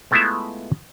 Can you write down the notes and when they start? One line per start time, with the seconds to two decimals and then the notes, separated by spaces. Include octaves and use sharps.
0.11 G#3 A3 B3 E4 F4 E5